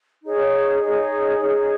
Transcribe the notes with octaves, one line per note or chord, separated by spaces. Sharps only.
D#4 G#4 C#5
D#4 G#4 C#5
D#4 G#4 C#5